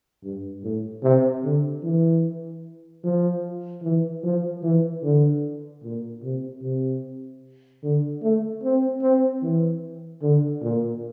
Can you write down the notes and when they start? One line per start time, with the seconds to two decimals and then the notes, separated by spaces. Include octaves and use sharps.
0.23 G2
0.63 A2
1.03 C3
1.44 D3
1.83 E3
3.04 F3
3.83 E3
4.23 F3
4.63 E3
5.03 D3
5.83 A#2
6.23 C3
6.62 C3
7.83 D3
8.22 A3
8.63 C4
9.02 C4
9.42 E3
10.22 D3
10.62 A#2